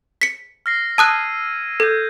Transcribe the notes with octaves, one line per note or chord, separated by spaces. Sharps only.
B6 C#7
F6 A#6 C7
A5 D#6 E6 F#6 G#6 D#7
A4 G6 G#6